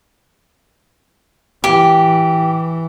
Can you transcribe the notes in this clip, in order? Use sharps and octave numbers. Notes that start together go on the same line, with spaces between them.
E3 G4